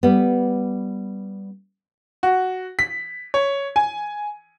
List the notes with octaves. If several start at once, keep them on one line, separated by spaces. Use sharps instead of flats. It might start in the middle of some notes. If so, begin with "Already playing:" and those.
G3 B3
F#4
B6
C#5
G#5